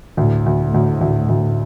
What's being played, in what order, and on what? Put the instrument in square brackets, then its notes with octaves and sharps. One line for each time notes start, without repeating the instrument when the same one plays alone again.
[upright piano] D2 [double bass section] A2
[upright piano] D2
[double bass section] A2
[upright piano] D2
D2
D2